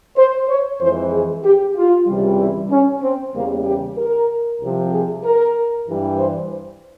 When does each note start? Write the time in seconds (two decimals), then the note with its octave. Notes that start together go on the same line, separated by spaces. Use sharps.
0.18 C5
0.49 C#5
0.81 F2 E3 G#3 C5
1.13 G#4
1.44 G4
1.76 F4
2.07 C#2 C3 E3 G3
2.40 E4
2.71 C#4
3.03 C4
3.34 E2 C#3 G3 A#3
3.66 G4
3.98 A#4
4.61 C2 C3 F3
4.92 G#4
5.24 A#4
5.88 G2 E3 G3
6.19 C5